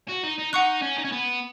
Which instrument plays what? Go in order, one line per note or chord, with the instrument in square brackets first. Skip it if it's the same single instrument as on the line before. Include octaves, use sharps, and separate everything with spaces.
[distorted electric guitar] F#4
D#4
D#4
[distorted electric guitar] D#4 [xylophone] F#5 C#6 F#6
[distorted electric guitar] C#4
D#4
C#4
B3